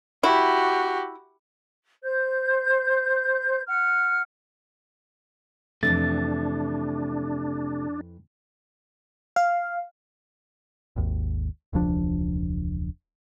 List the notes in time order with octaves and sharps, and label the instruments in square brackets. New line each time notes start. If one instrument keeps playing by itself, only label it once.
[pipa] E4 [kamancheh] F#4 G4
[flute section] C5 G6
F#5 F6
[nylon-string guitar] F2 G#2 E3 [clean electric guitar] C3 A3 [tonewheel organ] D4 [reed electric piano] A6
[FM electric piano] F5
[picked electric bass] G#1 D#2
E1 C#2 F3 D4